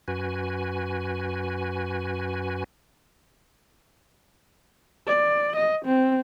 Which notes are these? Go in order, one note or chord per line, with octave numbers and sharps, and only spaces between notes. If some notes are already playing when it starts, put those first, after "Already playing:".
F#2 F#4 B4 G#5
D5
D#5
C4